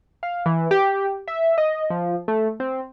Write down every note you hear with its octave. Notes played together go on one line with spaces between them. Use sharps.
F5
E3
G4
E5
D#5
F3
A3
C4